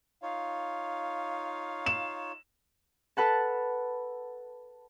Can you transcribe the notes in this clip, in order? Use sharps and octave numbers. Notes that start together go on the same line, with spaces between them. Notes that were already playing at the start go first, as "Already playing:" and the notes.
D#4 F4 C#5 F5
E7
A4 B4 F#5 A5